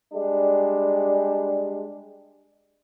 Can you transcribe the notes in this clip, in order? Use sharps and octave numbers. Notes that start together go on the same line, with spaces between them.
G3 G#3 D4